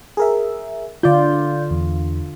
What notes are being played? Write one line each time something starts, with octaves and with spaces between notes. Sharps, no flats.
G#4 A#4 E5
D3 F4 D5 G6
E2